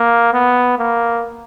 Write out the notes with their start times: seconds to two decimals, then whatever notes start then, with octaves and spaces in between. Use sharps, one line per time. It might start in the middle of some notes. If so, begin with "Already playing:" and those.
Already playing: A#3
0.33 B3
0.79 A#3